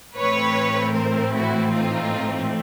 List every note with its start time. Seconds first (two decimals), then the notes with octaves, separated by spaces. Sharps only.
0.17 A2 E3 A3 C4 B4 C#5
0.95 A#4 C5
1.34 E4 F#4
1.72 D#4 F4